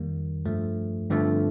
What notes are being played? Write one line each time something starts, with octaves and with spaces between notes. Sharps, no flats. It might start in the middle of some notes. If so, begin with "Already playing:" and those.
Already playing: F2 D#3 G3 A#3
G2 F3 A3
G2 D3 F3 A3 C4